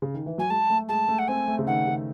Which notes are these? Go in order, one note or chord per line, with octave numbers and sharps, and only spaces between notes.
C#3
D#3
E3
F#3 G#5
G#3 A5
A3
G#3 A5
A3
F#5
C4 G#5
A3
C#3
D#3 F#5
C#3